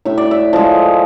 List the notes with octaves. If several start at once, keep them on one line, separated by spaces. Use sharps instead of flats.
A2 E5
D5
E5
F3 G#3